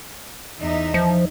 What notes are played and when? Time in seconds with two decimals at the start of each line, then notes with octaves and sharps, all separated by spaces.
0.60 E2 D#4 E5
0.94 F3